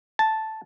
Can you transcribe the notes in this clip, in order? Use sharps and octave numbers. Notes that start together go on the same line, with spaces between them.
A5